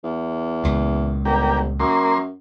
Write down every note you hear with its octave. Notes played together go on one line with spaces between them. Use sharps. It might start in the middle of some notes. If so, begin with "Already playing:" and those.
E2
C#2 A#2
G1 A#3 G4
F#2 A#3 C6